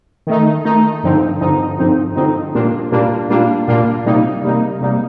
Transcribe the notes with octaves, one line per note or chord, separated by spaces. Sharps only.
D#3 A3 D#4
D#3 A3 D#4
G2 D3 F3 C4 D#4
G2 D3 F3 C4 D#4
G2 D3 F3 C4 D#4
G2 D3 F3 C4 D#4
A#2 G3 A#3 D4 F4
A#2 G3 A#3 D4 F4
A#2 G3 A#3 D4 F4
A#2 G3 A#3 D4 F4
C3 G3 A#3 D#4
C3 G3 A#3 D#4
C3 G3 A#3 D#4